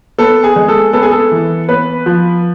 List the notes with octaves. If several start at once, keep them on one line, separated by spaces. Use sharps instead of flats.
B3 A4
G#4
G#3
A4
B3 A4
G#4
A4
E3
B3 B4
F3